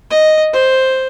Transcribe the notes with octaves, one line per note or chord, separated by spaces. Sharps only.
D#5
C5